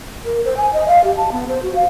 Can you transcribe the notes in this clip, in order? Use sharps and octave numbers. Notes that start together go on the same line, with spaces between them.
A#4
C5
G#5
D#5
F5
G4
A5
B3
C5
F#4
F5